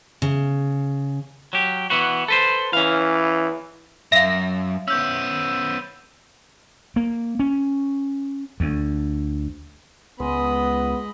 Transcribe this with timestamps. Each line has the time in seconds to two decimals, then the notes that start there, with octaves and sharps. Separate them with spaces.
0.22 C#3
1.53 F#3 G4
1.90 E3 B3 F#4
2.28 A4 B4 C5
2.73 E3 C#4 F5
4.12 F#2 E5 F5 A#6
4.88 B3 C#4 E6 G6
6.96 A#3
7.39 C#4
8.60 D2
10.20 C#2 G#3 B3 D#5 B5